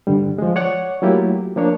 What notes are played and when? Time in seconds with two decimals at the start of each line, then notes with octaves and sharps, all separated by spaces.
0.07 G2 D3 G3
0.38 F3 G#3
0.56 C#5 D5 F#5 C#6
1.02 F#3 A3 A#3 E4 F4 G4
1.56 F3 A#3 D4 C#5